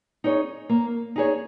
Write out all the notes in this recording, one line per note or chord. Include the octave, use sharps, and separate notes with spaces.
D#4 G#4 C#5
A#3
D#4 G#4 C#5